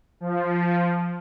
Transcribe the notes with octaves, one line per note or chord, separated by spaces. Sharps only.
F3